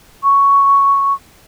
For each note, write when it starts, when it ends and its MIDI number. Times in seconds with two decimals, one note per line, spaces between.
0.24 1.13 85